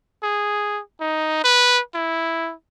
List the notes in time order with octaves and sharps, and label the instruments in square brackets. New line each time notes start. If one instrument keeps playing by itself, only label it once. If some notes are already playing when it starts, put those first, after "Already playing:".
[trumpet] G#4
D#4
B4
E4